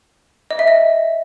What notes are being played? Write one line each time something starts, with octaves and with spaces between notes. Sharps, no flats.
D#5
E5
D#5